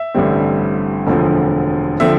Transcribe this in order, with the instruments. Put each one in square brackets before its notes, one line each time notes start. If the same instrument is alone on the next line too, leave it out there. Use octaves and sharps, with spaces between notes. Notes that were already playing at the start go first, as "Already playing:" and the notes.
Already playing: [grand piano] E5
A1 G2 D3 G3 C4
E1 D2 D3 F3 C4
D3 F3 C4 E5